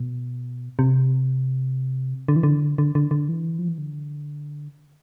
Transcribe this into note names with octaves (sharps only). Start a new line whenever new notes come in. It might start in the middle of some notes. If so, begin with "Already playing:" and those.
Already playing: B2
C3
D3
E3
D3
D3
D3
D3
E3
F3
E3
D3